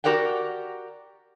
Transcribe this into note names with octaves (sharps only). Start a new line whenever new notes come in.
F#4 G4 A#4 D5 F#5 G5